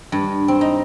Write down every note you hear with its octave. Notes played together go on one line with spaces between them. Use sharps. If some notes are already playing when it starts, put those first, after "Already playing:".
G2
C4
D#4